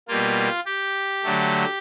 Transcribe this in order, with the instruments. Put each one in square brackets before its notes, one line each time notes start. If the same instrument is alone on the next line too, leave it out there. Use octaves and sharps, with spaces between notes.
[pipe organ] B2 G3 A#3 F4
G4
D3 F#3 A3